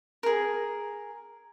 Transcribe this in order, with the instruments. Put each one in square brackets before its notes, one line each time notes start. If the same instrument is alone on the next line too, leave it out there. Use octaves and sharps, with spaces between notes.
[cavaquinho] G#4 A#4